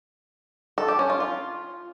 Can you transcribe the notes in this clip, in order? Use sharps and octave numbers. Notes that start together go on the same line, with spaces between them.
A4
G4
C#4
F4
F4